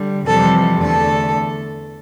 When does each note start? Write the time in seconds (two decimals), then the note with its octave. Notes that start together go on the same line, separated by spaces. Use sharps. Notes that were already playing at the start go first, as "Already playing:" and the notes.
Already playing: D3 G3
0.26 F2 C3 E3 G3 A4
0.81 E2 D3 A3 A4